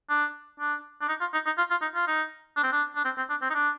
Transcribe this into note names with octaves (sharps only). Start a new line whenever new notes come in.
D4
D4
D4
D#4
F4
D#4
D#4
F4
F4
D#4
F4
D#4
D4
C4
D4
D4
C4
C4
D4
C4
D#4
D4